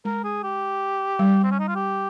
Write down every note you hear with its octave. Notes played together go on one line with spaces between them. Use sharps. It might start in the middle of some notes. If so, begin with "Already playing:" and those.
G#3 A#4
G#4
G4
G3
C4
C#4
D#4
F4
G4